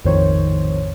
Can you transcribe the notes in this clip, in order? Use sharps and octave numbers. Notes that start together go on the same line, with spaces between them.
A#1 F2 A2 D#3 C5 C#5